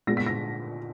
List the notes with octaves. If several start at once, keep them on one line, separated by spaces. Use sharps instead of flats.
A#2 G#3 B3 A#6
B6
A#6